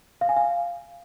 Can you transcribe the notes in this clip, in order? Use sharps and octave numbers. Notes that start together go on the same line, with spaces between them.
F5
G#5
F5